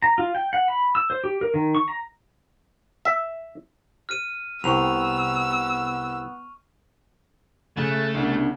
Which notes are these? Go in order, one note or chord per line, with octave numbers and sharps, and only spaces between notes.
A#5
F4
G5
F#5
B5
E6
C5
G4
A#4
D#3
C#6
A#5
E5
F6 D#7
C2 B3 C4 C#6 E6 F7
C#3 A3 F#6 A6
C2 B3 C#4 D4